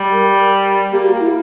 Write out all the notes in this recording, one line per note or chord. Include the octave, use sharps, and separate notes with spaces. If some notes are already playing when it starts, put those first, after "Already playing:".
Already playing: G3
A#4
A#3 G4
F#4
A#3
E4